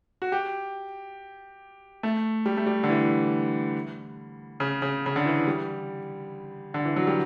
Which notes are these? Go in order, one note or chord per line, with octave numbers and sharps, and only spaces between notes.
F#4
G4
A3
G3
A3
G3
D3
E3
C#3
C#3
C#3
D3
E3
G3
D3
E3
F#3
G3